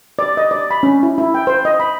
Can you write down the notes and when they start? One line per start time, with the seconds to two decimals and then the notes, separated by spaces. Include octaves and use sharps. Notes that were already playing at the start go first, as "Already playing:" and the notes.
0.19 D5
0.37 D#5
0.51 D5
0.71 B5
0.83 C#4
1.03 E4
1.18 E4
1.34 G5
1.47 C5
1.65 D#5
1.80 B5